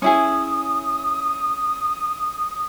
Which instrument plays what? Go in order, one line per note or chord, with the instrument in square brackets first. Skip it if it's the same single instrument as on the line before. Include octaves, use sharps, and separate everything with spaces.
[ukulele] C#4 E4 G#4 [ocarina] D#6